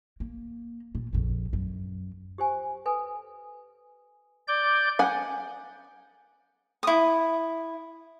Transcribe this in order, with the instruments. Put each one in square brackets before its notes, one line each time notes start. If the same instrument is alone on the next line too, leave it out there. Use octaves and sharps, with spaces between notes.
[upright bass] A#3
A#2
A#1 F2
F#2
[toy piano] G4 C5 G#5
A4 B4 G#5
[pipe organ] D5 G6
[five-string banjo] F#5 G#5
[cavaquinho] E4 D#6